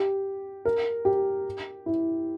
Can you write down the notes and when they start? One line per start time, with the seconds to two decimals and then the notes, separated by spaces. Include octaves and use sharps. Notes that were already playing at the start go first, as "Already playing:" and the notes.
Already playing: G4
0.65 A#4
1.05 G4
1.86 E4